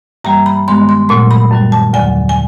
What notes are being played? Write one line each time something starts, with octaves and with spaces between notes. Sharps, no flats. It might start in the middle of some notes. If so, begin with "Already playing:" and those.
G2 E3 G3 A#3 A#5
B5
G2 D#3 G#3 B3 C6
C6
A#2 F#3 A3 C6
B5
F#2 D#3 G3
A5
D#2 D3 F#3 G#5
G#5